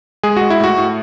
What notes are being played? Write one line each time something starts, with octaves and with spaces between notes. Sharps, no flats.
G#3 G#4
G#3 F#4
E4
A2 F#4
A2